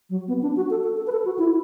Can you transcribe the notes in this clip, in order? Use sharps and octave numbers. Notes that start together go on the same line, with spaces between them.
F#3
B3
D4
F#4
A4
A4
A4
B4
A4
F#4
E4